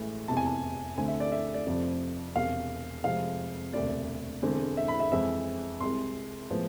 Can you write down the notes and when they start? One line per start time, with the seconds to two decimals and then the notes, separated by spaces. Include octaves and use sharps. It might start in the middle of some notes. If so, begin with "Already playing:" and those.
Already playing: A1 A2 E3 G#3
0.28 F1 E2 C3 A5
0.37 G#5
0.46 A5
0.97 D2 D3 A3 C4 G#5
1.08 E5
1.20 D5
1.32 E5
1.54 D5
1.66 F1 F2 C3 F3
2.35 E1 E2 C3 F5
3.04 F1 F2 C3 F3 G#3 F5
3.73 E1 D2 C3 D5
4.42 E1 E2 D3 G#3 C4
4.77 E5
4.88 B5
5.00 E5
5.12 F2 E3 G#3 C4 E5
5.80 C2 C3 G#3 C6
6.50 A2 F3 G#3 B3